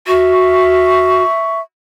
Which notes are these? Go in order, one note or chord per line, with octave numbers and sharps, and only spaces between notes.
F#4 E5 C#6